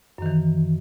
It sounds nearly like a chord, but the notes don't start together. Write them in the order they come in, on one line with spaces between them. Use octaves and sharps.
F#2 D#3 E3